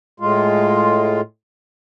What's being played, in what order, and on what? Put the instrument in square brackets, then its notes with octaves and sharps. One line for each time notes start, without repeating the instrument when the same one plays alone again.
[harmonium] A2 G#3 F4